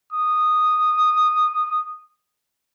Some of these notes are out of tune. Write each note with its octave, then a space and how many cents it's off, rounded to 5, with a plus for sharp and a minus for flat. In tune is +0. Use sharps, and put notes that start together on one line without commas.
D#6 -10